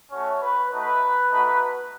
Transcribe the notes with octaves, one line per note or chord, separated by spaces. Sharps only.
A3 C#4 F#4 C#5
B4
A3 D#4 F#4 B4
A3 D#4 F#4